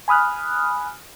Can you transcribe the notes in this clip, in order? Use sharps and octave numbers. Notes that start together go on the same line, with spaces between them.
G#5 B5 D#6 F6 F#6